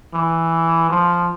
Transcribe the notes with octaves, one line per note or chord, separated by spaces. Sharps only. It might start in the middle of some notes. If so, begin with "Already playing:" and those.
E3
F3